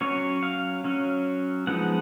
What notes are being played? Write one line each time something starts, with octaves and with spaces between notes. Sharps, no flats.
F#3 C#4 C#5
F5
F#3 C#4
F3 G#3 B3 D#4 F#5